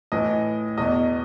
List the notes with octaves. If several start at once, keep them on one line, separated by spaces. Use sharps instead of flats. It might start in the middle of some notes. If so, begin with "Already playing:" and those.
A2 E3 D#5
E2 B2 D#5